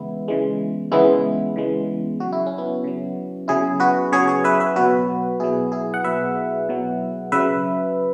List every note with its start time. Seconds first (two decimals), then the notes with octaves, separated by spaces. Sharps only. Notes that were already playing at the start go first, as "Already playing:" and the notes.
Already playing: C#3 E3 G#3 B3 E4
0.28 C#3 E3 G#3
0.92 C#3 E3 G#3 B3 E4
1.56 C#3 E3 G#3
2.20 C#3 F#3 F#4
2.32 E4
2.46 C#4
2.58 B3 E4
2.84 C#3 F#3
3.48 C#3 F#3 E4 G#4
3.80 F#4 B4
4.12 C#3 F#3 G#4 C#5
4.28 G#4 C#5
4.44 B4 E5
4.60 B4 E5
4.76 B2 F#3 F#4 B4
5.40 B2 F#3 E4 G#4
5.72 E4 G#4
5.94 F#5
6.04 B2 F#3 B4 E5
6.69 B2 F#3
7.32 C#3 F#3 B4 E5